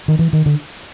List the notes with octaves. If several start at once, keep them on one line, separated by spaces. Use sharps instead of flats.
D#3
E3
D#3
D3